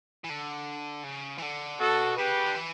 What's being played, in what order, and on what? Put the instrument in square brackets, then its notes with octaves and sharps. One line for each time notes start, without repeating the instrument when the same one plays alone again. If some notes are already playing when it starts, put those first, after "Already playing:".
[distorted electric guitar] E3
D3
C#3
E3
D3
[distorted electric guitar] B2 [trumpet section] F#4 A4
[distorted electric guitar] C#3 [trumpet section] G4 B4
[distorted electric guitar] D3
E3